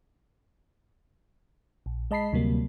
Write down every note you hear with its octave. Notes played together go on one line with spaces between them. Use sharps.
A#1
G#3 D#5 A5 B5 B6 C7
D2 C3 F#3 G3 A#3